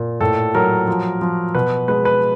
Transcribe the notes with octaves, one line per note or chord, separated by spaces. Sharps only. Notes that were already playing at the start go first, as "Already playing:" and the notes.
Already playing: A#2
A2 A4
F#3 A#4
F3
F3
B2 B4
G#3 B4
B4